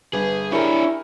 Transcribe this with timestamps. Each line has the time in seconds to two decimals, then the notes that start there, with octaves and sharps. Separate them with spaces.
0.13 G1 G#4 B4
0.52 D4 E4 G4 G#4 A#4 C#5